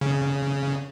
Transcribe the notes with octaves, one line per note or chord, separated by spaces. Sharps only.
C#3